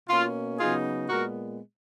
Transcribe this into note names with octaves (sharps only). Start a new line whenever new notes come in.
B2 A#3 C#4 F4
C#3 F#3 B3 D#4 F4 G#4
A#2 G#3 B3 F#4 A#4